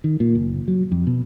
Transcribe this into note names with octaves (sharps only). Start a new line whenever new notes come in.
D#3
A#2
F#1
F#3
F2
B2